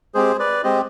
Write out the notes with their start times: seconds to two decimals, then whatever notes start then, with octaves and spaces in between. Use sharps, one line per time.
0.14 G#3 C4 G4 G#4 C5
0.39 B4 D5
0.64 G#3 C4 G4 C5 D#5